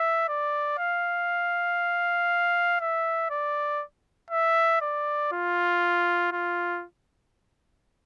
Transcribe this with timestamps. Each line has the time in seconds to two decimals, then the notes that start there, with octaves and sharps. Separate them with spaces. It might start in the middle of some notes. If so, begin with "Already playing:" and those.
Already playing: E5
0.28 D5
0.78 F5
2.80 E5
3.30 D5
4.30 E5
4.81 D5
5.32 F4
6.32 F4